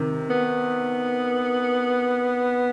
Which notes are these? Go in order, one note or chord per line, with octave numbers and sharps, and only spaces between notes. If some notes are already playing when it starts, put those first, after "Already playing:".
Already playing: C3 D#3
B3